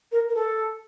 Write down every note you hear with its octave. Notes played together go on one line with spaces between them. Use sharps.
A#4
A#4
A4